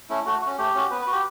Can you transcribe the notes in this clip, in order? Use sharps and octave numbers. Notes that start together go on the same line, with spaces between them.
A3 C#4 E4
A3 F#4
C#4 F#4
A3 G4
C#4 F#4
B3 B4
B4
F#4
G4